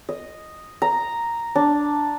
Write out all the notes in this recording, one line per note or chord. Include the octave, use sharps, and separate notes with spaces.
D#5
A#5
D4